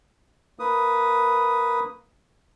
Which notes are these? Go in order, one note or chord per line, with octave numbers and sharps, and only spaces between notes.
A#3 B4 D#6